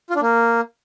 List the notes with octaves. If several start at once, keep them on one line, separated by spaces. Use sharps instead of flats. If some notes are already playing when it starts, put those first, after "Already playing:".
F4
D4
A#3